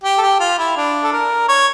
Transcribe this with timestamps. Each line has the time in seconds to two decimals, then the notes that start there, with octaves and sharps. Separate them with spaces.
0.04 G4
0.18 A4
0.22 G4
0.40 F4
0.58 E4
0.77 D4
1.04 A4
1.13 A#4
1.49 C#5